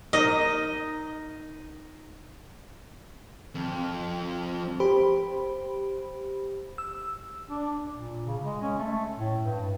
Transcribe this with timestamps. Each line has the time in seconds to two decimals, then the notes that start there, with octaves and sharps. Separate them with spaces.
0.13 D#4 A#4 D#5
3.55 F2
4.80 G4 C5 B5
6.78 E6
7.48 D4
7.93 A#2
8.27 C#3
8.42 G#3
8.62 C#4
8.78 A3
9.18 A2
9.42 G2